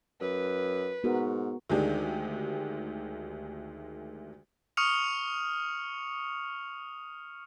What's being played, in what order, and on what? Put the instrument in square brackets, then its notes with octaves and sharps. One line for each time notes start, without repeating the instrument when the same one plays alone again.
[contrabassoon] F#2 [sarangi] B4
[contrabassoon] G#2 [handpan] B3 F#4 A#4
[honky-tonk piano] D2 D#3 G#3 D4 G4 G#4
[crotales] C#6 D#6 F6 C#7 F7